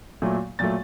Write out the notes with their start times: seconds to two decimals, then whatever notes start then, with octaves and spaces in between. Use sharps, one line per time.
0.22 A#2 F#3 A3
0.59 A#2 F#3 A3 A6